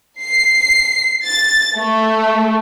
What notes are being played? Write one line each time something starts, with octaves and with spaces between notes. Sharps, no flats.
C7
A6
A3